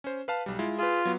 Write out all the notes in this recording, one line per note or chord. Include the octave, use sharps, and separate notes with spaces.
C#4 C5
B4 F5 A5
B1 G3
G#3 E4 F4
F4 G#4 B4
F#3 B3